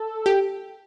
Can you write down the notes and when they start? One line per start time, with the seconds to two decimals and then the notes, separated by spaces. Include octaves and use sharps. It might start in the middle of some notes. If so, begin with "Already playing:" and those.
Already playing: A4
0.26 G4